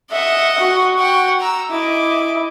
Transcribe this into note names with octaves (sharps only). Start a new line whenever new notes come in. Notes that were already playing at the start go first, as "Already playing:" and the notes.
D#5 E5 F#5
F#4
F#5 G5
A#5 E6
E4 D#5 D6